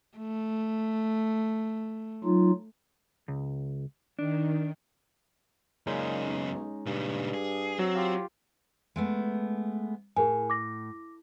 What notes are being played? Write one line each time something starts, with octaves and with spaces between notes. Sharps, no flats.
A3
F#3 D#4 F4
C#2
D#3 D4
F#2 A#2 C#3 G#3 C#4 D#4
B1
G2 A#2 C#3
G#4
F#3 C4
F4 G4 F5
G#3 A3 B3
A2 G#4 A#4 G#5
D6 A#6